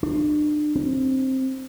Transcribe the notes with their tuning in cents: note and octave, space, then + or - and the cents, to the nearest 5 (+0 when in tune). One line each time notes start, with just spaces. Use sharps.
D4 +35
C4 +10